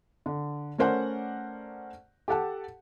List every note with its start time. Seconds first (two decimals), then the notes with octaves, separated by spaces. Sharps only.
0.26 D3
0.78 A3 C#4 A#4 C5 D5 F#5
2.28 G4 A4 F#5 A5